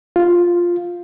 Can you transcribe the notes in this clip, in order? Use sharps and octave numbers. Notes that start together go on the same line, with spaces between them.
F4